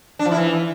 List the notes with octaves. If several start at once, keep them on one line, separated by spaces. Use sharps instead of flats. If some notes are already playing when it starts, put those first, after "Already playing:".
D4
F3
E4
E3